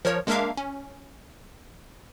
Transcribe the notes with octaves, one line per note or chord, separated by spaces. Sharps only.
F3 A#4 C#5
G#3 A#3 D4 A#4 E5 F5
C#4